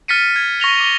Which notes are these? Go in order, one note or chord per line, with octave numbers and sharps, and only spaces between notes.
F6 A6 B6 C#7 D#7
G#6
C#6 A#6 F7 G7
D6 G7